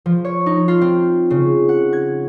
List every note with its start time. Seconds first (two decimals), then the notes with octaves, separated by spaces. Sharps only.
0.06 F3
0.25 C#5
0.46 D#4
0.68 F4
0.81 C4
1.30 C#3
1.69 F#5
1.93 G#6